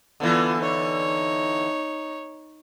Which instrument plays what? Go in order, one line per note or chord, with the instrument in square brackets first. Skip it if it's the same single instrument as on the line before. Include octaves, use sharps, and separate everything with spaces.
[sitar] D3 E3 [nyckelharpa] B3 F4
[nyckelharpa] D#4 C#5